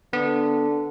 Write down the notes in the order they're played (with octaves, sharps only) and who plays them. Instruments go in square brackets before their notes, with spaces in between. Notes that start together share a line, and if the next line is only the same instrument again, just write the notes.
[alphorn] D3 [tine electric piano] B3